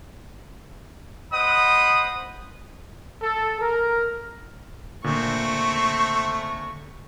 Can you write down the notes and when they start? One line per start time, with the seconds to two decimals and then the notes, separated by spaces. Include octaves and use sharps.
1.32 C5 D#5 F#5 B5 D#6
3.21 A4
3.60 A#4
5.04 A#2 D3 A3 C4 C#6